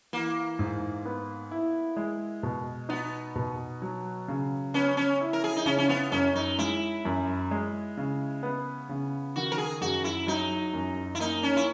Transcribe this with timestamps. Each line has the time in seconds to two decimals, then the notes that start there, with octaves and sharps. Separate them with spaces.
0.13 E3 A#3
0.59 G#2
1.06 B3
1.51 E4
1.97 G#3
2.43 B2
2.89 B3 D#4
3.36 B2
3.82 F#3
4.28 C#3
4.74 B3 C#4
4.97 C#4
5.21 E4
5.33 A#4
5.44 G#4
5.57 D#4
5.66 C#3 C#4
5.78 C#4
5.89 B3
6.12 F#2 C#4
6.35 D#4
6.59 G#3 E4
7.05 F#2
7.51 G#3
7.97 C#3
8.43 B3
8.89 C#3
9.36 D#3 F#4
9.52 A#4
9.58 G#4
9.81 F#2 F#4
10.04 E4
10.27 F#3 D#4
10.74 F#2
11.15 E4
11.20 A#3 D#4
11.43 C#4
11.57 E4